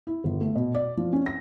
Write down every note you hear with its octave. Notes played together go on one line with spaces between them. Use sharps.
E4
G1
A3
B2
D5
F3
C#4
A#6